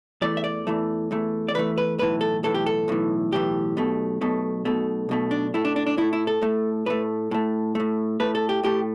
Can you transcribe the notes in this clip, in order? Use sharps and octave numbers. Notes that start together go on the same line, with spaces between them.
E2 E3 A3 D5
E5
D5
E2 E3 A3
E2 E3 A3
D5
E2 E3 A3 B4
B4
B1 A2 E3 B4
A4
B1 A2 E3 A4
G4
A4
B1 A2 E3
B1 A2 E3 G4
B1 B2 A3
B1 B2 A3
B1 B2 A3
B1 B2 A3
D4
A2 A3 E4
D4
D4
D4
A2 A3 E4
E4
A4
A2 A3
A2 A3 B4
A2 A3
A2 A3
A2 A3 B4
A4
G4
A2 A3 G4